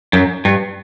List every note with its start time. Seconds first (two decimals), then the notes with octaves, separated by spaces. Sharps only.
0.13 F#2
0.45 G2